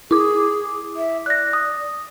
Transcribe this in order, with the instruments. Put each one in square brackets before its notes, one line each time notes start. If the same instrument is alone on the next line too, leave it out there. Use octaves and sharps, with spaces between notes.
[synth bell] E4 D6 [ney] G#4
[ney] E5
[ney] D5 [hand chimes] F#6 A#6
[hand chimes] D#6